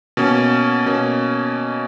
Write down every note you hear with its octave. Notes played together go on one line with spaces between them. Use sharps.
B2 A#3 C#4
B2 A#3 C#4